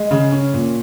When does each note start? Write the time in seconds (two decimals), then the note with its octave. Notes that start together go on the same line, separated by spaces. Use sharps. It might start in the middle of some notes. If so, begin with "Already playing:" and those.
Already playing: G#3
0.11 C#3
0.32 C#4
0.54 A#2